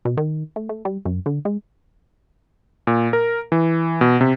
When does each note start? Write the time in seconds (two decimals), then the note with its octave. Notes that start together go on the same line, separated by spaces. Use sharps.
0.05 B2
0.17 D#3
0.56 A3
0.69 A3
0.85 G3
1.05 F#2
1.26 D3
1.45 G#3
2.87 A#2
3.13 A#4
3.52 E3
4.01 B2
4.21 C3